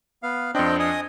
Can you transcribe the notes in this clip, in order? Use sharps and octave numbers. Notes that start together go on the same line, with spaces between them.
B3 F5
F2 C4 D4 D#5 G5
D#5 G#5 D#6